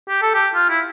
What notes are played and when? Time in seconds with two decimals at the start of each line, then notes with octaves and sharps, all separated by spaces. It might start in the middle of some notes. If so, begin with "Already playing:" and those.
0.09 G4
0.22 A4
0.34 G4
0.55 F4
0.69 E4